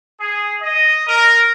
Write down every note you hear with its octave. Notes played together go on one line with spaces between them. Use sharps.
G#4
D#5
A#4